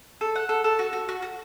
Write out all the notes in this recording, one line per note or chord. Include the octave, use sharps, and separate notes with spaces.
A4
F#5
A4
A4
F#4
F#4
F#4
F#4